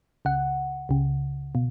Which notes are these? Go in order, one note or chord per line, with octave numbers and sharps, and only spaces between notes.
C#2 C#3 F#5
C#2 C#3
B2